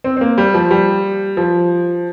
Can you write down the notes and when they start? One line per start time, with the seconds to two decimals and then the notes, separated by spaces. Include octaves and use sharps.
0.04 C4
0.17 C4
0.21 A#3
0.38 G3
0.54 F3
0.71 G3
1.37 F3